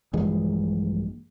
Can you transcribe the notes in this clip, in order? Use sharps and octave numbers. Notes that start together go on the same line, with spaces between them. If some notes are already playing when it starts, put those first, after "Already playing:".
A#1 G2 E3 G#3